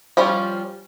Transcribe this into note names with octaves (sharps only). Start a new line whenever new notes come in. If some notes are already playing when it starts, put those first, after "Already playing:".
F3 G3 C#4 F4